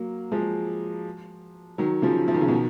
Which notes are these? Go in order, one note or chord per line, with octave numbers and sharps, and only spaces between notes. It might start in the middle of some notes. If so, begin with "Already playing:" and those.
Already playing: F#3 A#3
F3 G#3
D#3 F#3
C#3 F3
F3
D#3
C#3
B2 D#3